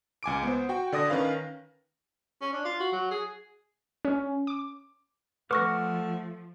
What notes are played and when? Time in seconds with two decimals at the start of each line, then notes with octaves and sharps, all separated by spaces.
0.23 C#2 G#5 D6 D7
0.43 B3 C5
0.69 F#4 G5
0.92 D3 D5 D#6 A#6
1.10 D#3 C#4 B4 F5
2.41 C#4
2.53 D4
2.65 F4
2.80 F#4
2.93 F#3
3.11 G#4
4.05 C#4
4.47 D6
5.51 F3 A3 B4 F#5 C#6 D6 F6 A#6